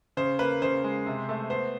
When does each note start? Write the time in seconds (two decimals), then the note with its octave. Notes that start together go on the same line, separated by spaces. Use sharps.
0.17 C#3 C5
0.39 A#3 B4
0.62 C#3 C5
0.84 G#3
1.06 C3
1.29 A3
1.50 B3 C5